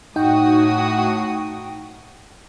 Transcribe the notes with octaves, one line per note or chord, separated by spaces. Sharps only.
A2 D#4 F#4 G5 D#6